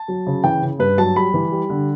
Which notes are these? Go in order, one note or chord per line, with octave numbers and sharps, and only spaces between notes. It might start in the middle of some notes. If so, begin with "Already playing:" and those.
Already playing: A5
F#3
C#3
E3 G5
C#3
G2 B4
F#3 A5
G3 B5
E3
G3
D3